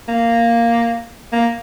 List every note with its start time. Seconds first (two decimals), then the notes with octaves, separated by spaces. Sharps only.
0.08 A#3
1.33 A#3